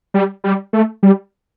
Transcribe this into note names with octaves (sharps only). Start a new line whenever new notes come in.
G3
G3
A3
G3